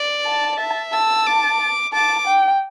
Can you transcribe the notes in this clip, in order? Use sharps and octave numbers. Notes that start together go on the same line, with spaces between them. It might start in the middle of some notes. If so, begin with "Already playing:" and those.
Already playing: D5
A5
E5
A5 E6
D6
A5 D6
G5